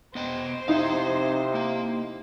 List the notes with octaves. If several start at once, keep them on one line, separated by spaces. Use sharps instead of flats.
B3 C5 D#5 G5
C3 C4 D#4 E4 F5
A#3 F5